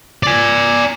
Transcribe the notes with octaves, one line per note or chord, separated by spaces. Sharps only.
D5 G#5